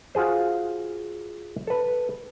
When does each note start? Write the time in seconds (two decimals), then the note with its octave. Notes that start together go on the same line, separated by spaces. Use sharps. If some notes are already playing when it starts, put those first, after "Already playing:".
0.15 F4 F#4 G#4 C5
1.67 A4 B4